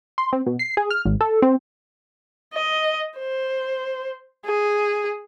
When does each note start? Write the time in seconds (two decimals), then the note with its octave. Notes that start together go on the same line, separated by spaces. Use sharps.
0.18 C6
0.33 C4
0.46 B2
0.59 C7
0.77 G#4
0.91 F6
1.05 G#1
1.21 A4
1.42 C4
2.54 D#5
3.18 C5
4.45 G#4